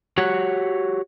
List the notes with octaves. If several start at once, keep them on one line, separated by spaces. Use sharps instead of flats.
F#4 G4 C#5 F#5